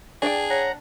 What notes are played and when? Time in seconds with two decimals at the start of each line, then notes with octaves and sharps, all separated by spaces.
0.22 D4 G#4 D5 G5
0.50 C#5 F#5 A#5